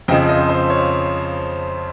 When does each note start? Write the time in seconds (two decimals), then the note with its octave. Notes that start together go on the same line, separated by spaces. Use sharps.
0.08 F2 C#3 F3 D#5 G5
0.29 C5 D#5
0.49 C5
0.70 C#5